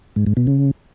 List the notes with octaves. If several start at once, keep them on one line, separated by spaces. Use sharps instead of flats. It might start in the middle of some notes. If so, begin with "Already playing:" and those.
G#2
G#2
B2
C#3